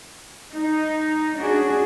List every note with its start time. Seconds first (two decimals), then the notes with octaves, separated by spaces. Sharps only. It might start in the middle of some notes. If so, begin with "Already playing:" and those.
0.52 D#4
1.39 C#4 D4 F#4 G#4